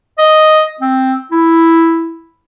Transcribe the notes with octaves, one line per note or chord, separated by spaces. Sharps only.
D#5
C4
E4